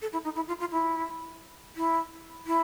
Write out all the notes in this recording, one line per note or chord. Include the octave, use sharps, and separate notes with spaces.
A4
E4
D#4
E4
F4
F4
E4
E4
E4